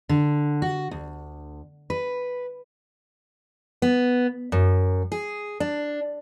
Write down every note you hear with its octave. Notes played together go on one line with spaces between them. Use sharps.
D3
F#4
D2
B4
B3
F#2
G#4
D4